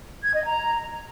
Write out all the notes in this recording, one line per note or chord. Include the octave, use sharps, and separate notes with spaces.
G#6
D#5
A#5